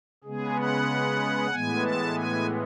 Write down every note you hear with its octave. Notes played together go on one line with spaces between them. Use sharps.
C#3 G#3 B3 G#4
F#5
A2 E3 G#3 B3 G#5
A5
G#5